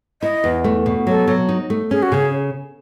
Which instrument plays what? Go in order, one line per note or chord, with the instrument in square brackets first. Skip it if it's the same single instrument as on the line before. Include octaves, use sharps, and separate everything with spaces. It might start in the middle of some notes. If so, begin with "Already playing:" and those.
[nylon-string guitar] E4 [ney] D#5
[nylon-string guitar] E2
A3
B2
[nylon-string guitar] F#3 [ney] A4
[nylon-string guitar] F#3
D#4
A3
[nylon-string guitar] C#4 [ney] G#4
[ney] F#4
[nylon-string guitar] C#3 [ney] G#4